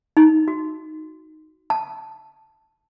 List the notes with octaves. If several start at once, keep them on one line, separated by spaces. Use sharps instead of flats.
D#4
F#4
A5